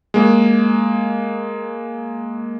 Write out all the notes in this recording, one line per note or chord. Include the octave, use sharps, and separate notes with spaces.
G#3 A#3